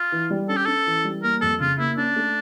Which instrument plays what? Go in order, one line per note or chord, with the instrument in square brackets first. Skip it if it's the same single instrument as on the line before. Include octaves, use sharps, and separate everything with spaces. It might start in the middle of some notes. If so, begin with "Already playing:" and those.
Already playing: [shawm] F4
[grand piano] E3
G3
[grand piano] C#4 [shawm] A4
[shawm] G4
[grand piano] C#4 [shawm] A4
[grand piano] E3
G3
[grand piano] A#3 [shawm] A#4
[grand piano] F2 [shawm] A4
[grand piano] C#3 [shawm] F4
[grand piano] A#3 [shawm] E4
[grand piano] C#4 [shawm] D4
[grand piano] A3